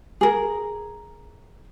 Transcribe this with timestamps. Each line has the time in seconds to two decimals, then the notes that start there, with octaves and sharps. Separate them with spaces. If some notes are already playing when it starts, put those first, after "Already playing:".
0.21 G#4 A#4